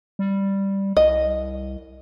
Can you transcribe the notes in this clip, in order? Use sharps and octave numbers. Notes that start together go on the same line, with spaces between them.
G3
C2 D#5